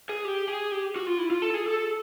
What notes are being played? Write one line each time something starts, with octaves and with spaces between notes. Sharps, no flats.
G#4
G4
G#4
G4
F#4
F4
E4
F4
A4
G#4
A4